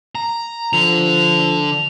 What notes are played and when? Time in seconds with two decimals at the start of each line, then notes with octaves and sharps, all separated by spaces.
0.15 A#5
0.73 D3 F3 F7